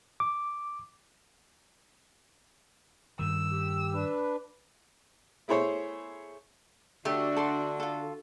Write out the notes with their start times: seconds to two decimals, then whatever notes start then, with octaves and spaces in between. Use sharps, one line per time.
0.20 D6
3.19 G2 D#3 E6
3.51 G4
3.94 D4 B4
5.48 A3 E4 G#4 C5 C#5
7.05 D3 A3 D4 F#4 G4
7.37 A4 D5 C6
7.80 F4 A4